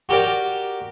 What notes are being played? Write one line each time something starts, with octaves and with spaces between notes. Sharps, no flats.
F#4 G4 A#4 D5 G5